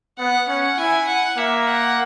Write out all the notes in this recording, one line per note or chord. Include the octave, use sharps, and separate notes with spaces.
B3 F#5
C#4 F#5
E4 G#5
F#5
A#3 E5
F#5